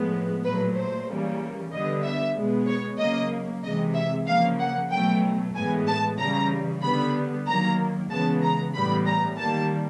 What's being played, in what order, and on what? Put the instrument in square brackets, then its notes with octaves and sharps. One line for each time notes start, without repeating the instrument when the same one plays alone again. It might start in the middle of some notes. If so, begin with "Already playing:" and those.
Already playing: [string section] A2 F3 G#3 B3
A#2 F#3 A3 B4
C5
C#3 E3 G3 A#3
D3 G3 B3 D#5
E5
B2 G#3 B3
C#5
C#3 F#3 A#3 D#5
C3 E3 G#3 D#5
E5
C#3 F3 A#3 F5
F#5
B2 F#3 A3 G5
A2 E3 G#3 B3 G#5
A5
C#3 E3 G3 A#5
D3 G3 B3 B5
D#3 F#3 A#3 A#5
C#3 E3 G#3 B3 A5
A#5
A2 E3 G3 B3 B5
A#5
D#3 G3 A#3 A5